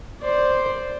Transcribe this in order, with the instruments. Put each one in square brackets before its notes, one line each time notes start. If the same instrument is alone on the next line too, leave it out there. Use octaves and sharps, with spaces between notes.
[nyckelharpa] C5 D5